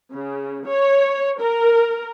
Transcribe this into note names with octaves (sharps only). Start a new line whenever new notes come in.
C#3
C#5
A#4